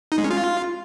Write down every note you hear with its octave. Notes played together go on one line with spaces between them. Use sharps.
D#4
G#3
C#4
F4